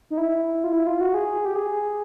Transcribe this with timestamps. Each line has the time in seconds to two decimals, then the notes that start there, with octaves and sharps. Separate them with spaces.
0.10 D#4
0.18 E4
0.64 F4
0.73 E4
0.87 F4
1.01 F#4
1.14 G#4
1.45 G4
1.56 G#4